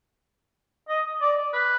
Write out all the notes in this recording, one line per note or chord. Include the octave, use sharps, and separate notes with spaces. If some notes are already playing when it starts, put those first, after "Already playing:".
D#5
D5
B4